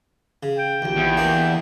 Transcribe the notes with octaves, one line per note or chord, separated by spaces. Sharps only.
C#3
G5
A#1 D#2
E2
A#3 D4